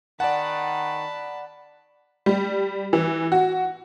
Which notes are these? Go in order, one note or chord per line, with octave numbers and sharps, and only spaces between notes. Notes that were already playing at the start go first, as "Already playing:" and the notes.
D#3 D5 F#5 A5 B5
G3
E3
F#4